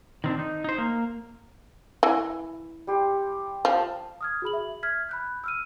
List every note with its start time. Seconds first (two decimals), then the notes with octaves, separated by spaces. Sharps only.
0.24 D#3 C4 D4
0.39 D#4
0.64 D#4 C5
0.78 A#3
2.03 E3
2.87 G3 G4 C6
3.65 F3 A5
4.21 D#6 F6 G#6
4.42 F#4 G#4 B5 F#7
4.53 E5
4.83 F6 G#6 B6
5.09 B5 F#6 G6
5.44 E6 F6 D#7